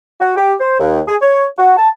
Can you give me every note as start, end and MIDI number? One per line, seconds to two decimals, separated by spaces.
0.20 0.34 66
0.36 0.54 67
0.60 0.76 72
0.79 1.00 39
1.08 1.16 68
1.21 1.45 73
1.57 1.76 66
1.77 1.88 81